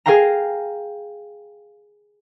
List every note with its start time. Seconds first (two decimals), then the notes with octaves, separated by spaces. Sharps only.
0.06 G#4 A#4 F5 G5 A#5